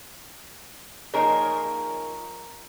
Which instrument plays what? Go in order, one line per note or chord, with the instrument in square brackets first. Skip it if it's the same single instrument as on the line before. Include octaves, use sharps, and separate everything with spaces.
[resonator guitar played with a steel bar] F3 A#3 D#4 G#4 A#4 C#5